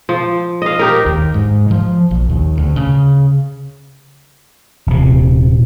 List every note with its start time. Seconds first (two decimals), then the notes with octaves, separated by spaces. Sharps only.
0.09 F3
0.62 D#5 F5
0.79 D#4 G4 A#4
1.06 D#2
1.34 G#2
1.71 F3
2.11 A#1
2.29 D#2
2.58 D2
2.76 C#3
4.87 D#1 C3